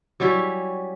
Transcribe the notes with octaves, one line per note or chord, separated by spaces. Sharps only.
F#3 G3 C#4 E4